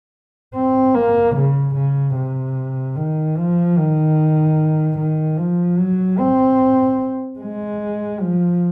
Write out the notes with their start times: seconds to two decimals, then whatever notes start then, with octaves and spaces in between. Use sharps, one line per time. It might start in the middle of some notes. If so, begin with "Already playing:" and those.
0.55 C4
0.95 A#3
1.36 C#3
1.75 C#3
2.16 C3
2.96 D#3
3.37 F3
3.77 D#3
4.97 D#3
5.37 F3
5.78 F#3
6.18 C4
7.40 G#3
8.20 F3